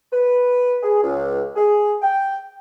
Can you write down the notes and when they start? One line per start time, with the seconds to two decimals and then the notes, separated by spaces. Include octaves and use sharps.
0.12 B4
0.83 G#4
1.03 C#2
1.56 G#4
2.02 G5